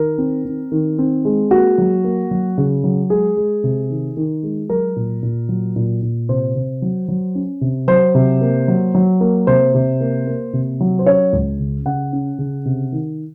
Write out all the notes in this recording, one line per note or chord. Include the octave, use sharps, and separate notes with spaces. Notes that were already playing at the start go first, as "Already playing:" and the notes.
Already playing: D#3 A#4
C4
C4
D#3
C4
G#3
A#3 F#4
F#3
A#3
F#3
C#3
F#3
G#3 G#4
G#3
C3
D#3
D#3
G#3
F#3 A#4
A#2
A#2
F#3
A#2
A#2
C3 C5
C3
F#3
F#3
C#4
C3
F#3 C5
C3
A#3
F#3
F#3
A#3
C3 C5
C3
A#3
A#3
C3
F#3
C5
C#4 C#5
C#2
C#3
C#3 F#5
C#4
C#3
C3
D#3